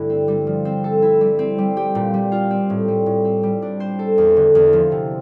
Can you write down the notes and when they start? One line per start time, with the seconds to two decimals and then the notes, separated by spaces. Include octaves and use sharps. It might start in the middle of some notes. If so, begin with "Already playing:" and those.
Already playing: G2 D3 A3 E4
0.10 C4
0.28 G3
0.47 F3
0.65 C4
0.84 A4
1.02 E4
1.21 G3
1.39 C4
1.58 G3
1.77 G4
1.95 A#2
2.14 G3
2.32 F4
2.51 C4
2.70 A2
2.88 G3
3.06 A2
3.25 C4
3.43 G3
3.62 D4
3.80 C5
3.99 A4
4.18 E2
4.37 D3
4.55 E2
4.73 F3
4.92 C3